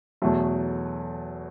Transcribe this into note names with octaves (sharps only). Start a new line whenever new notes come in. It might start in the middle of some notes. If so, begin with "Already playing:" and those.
E2 B2 F#3 A3